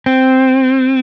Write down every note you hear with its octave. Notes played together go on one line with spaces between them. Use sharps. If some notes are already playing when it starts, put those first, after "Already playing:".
C4